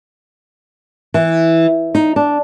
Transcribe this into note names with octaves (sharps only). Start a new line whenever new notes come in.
E3
D#4
D4